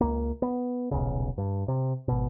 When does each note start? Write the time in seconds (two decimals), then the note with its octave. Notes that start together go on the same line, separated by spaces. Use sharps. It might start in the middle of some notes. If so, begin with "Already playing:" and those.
0.01 C#2 A#3
0.42 B3
0.91 D#1 B1 C#3
1.38 G2
1.68 C3
2.08 G#1 B2